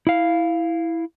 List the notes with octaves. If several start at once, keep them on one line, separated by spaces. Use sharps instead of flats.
E4 F5